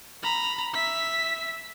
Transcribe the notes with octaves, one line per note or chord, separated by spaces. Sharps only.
A#5 B5
E5 B6